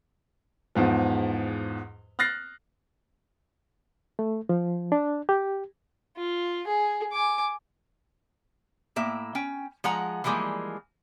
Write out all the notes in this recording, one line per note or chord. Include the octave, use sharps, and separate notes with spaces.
E2 G#2 F3
F6 F#6 A6 A#6 C7
A3
F3
D4
G4
F4
G#4
G#5 D6
A2 A#3 E5
C#4 G5
F3 G#3 F#5 A#5
E3 F3 G3 G#3 A#3